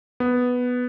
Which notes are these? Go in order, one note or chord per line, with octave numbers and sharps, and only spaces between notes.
B3